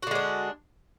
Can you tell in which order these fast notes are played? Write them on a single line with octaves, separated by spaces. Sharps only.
F#4 D3 G#3 D4